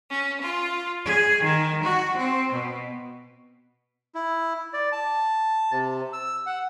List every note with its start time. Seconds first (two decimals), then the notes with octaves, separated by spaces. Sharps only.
0.10 C#4
0.42 F4
1.06 G#4
1.42 D#3
1.84 F#4
2.17 C4
2.53 B2
4.15 E4
4.74 D5
4.92 A5
5.72 C3
6.13 E6
6.47 F#5